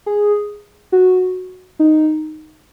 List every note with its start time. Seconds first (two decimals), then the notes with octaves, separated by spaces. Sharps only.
0.06 G#4
0.92 F#4
1.79 D#4